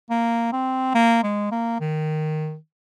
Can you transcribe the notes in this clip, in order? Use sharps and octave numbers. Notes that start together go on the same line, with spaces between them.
A#3
C4
A#3
G#3
A#3
D#3